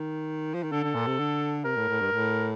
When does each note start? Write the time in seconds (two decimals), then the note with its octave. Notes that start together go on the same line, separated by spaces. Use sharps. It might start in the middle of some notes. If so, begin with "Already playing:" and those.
Already playing: D#3
0.54 F3
0.63 D#3
0.72 D3 A4
0.84 D3
0.95 A#2
1.07 C3
1.19 D3
1.65 C3 A#4
1.77 A2
1.89 A2
2.01 G2
2.12 A2